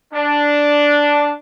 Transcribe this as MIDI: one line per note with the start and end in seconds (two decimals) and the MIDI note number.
0.14 1.32 62